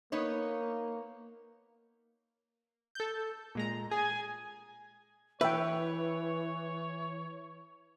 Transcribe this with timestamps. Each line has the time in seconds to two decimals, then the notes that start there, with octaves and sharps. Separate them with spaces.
0.12 A#3 B3 D#4 C#5
2.95 A4 G6
3.55 A#2 G#3 A#5
3.91 G#4 G#5
5.41 E3 B4 C#5 E5 G5